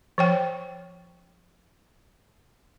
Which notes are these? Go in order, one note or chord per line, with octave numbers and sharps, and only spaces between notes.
F3 C#5 G5